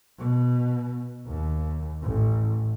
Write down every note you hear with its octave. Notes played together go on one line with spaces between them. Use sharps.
B2
D#2
A1